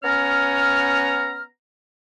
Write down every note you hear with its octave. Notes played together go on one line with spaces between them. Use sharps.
B3 C#4 C#5 A#5 F6